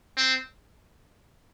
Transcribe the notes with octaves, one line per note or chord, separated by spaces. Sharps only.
C4